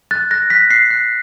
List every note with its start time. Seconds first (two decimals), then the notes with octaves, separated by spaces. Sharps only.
0.11 F#6 A6
0.31 F#6 A#6
0.50 F#6 B6
0.70 F#6 C7
0.91 F#6